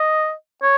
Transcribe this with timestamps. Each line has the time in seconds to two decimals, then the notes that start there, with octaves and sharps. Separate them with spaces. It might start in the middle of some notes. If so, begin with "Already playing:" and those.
Already playing: D#5
0.62 C#5